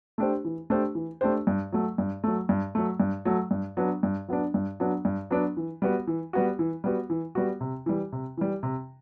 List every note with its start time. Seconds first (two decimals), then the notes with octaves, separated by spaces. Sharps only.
0.18 A3 D4 G4 C5
0.45 E3
0.70 A3 D4 G4 C5
0.95 E3
1.21 A3 D4 G4 C5
1.47 G2
1.72 F#3 A3
1.98 G2
2.24 F#3 A3
2.49 G2
2.75 F#3 A3
3.00 G2
3.25 F#3 A3
3.51 G2
3.77 F#3 B3 D4
4.03 G2
4.28 F#3 B3 D4
4.54 G2
4.80 F#3 B3 D4
5.05 G2
5.31 F#3 B3 D4
5.57 E3
5.82 G3 B3 F#4
6.07 E3
6.33 G3 B3 F#4
6.59 E3
6.84 G3 B3 F#4
7.10 E3
7.35 G3 B3 F#4
7.61 C3
7.86 E3 G3
8.12 C3
8.37 E3 G3
8.63 C3